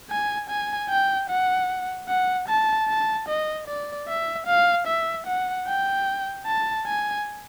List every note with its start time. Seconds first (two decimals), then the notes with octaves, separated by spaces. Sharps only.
0.10 G#5
0.50 G#5
0.90 G5
1.30 F#5
2.09 F#5
2.48 A5
2.89 A5
3.29 D#5
3.68 D5
4.08 E5
4.47 F5
4.87 E5
5.27 F#5
5.68 G5
6.47 A5
6.87 G#5